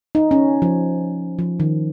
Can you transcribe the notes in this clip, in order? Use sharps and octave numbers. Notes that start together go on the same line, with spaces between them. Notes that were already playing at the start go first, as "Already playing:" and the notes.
D#4
C#4
F3
F3
D#3